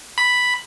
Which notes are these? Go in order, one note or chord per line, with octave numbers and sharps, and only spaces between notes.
B5